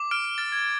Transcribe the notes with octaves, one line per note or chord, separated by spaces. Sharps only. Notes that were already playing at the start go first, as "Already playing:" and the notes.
Already playing: D6
F6 D7
D7
F6 A6
G#6